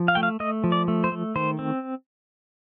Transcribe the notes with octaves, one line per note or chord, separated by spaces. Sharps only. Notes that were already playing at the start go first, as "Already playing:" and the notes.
Already playing: F3
F5
A3 G5
F5
A3 D#5
F3
D5
A3
C5
A3
D#3 C5
C4